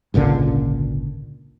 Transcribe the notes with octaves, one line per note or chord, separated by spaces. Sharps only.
G#1 C#2 A#2 D3